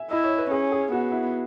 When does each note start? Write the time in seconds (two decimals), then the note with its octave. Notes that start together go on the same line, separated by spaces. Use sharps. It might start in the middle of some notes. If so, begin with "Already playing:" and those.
Already playing: E5 G#5
0.11 E4 D#5
0.24 C#5
0.38 B4
0.51 C#4 G#4
0.72 G#4
0.92 B3 F#4
1.12 E4